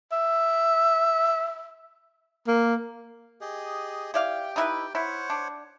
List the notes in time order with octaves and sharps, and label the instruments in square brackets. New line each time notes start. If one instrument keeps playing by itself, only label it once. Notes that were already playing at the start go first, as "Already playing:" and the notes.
[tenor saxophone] E5
A#3
[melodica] G4 G#4 D#5
[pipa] E4 D5 F5 [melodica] G4 G5
[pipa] D#4 E4 B4
[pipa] E4 [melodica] C5 C#5 F#5
[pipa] D4